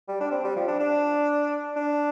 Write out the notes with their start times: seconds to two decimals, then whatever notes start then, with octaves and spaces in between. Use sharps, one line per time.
0.08 G3
0.21 D4
0.31 C4
0.45 G3
0.56 F3
0.67 D4
0.79 D4
1.76 D4